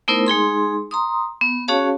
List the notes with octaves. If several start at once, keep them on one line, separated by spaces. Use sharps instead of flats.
A3 B3 D#4 E4 A#4 C5
G#3 D#4 G#4 C6
A#5 C6 D#6
B3
C#4 F#4 G#4 C#5 F5 A5